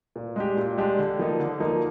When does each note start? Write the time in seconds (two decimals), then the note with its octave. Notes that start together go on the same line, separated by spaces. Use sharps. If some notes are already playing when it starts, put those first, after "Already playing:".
0.16 A#2
0.36 G#3 D4 G4
0.57 A#2
0.78 G#3 D4 G4
0.98 D3
1.19 F3 A#3 D#4
1.40 D3
1.60 F3 A#3 D#4